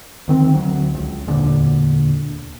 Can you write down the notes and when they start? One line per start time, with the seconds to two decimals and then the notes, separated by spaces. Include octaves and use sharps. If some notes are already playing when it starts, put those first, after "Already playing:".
0.28 D2 D#3 C4
0.54 D2 F#3
0.94 C#2
1.27 E1 D2 A#2 D3